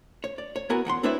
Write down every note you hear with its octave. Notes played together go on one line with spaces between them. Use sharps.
C#5
D5
C#5
B3 E4 F#4 A#4 G#5
E2 F#5 G5 C6
C4 D4 E4 B4 C#5 E5